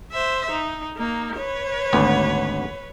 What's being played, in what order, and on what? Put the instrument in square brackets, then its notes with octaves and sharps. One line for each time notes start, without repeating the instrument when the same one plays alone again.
[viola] C5 E5
D#4
A#3 D#4
B4 C#5
[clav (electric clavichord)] G#1 D2 B3